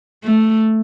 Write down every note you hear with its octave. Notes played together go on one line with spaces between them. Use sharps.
A3